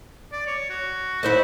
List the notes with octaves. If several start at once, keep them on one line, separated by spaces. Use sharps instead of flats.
D5
C#5
F#4
E4 C5 D#5